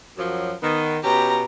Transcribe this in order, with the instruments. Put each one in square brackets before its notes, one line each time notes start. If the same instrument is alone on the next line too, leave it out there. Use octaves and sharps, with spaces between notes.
[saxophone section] F#2 F3 F#3
D#3 B3
[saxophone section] B2 C#4 G4 [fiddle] A#5